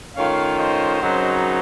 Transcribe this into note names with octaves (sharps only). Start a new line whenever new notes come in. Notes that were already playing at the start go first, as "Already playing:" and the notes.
D#3 A3 C#4 F4 C#5 F5
C5 D#5
F#2 C#3 F#3 C4 D#4